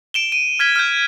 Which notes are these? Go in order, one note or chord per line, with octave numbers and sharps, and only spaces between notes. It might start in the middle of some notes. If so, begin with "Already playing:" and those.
D7 E7 G7
D#7
F6 G#6 B6 G7
F6 G6